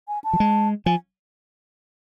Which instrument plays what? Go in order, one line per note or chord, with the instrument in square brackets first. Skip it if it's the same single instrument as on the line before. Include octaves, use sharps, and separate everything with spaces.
[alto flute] G#5
A5
[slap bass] F3
G#3
[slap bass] F3 [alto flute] G#5